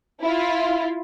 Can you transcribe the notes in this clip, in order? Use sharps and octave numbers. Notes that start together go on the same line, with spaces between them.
E4 F4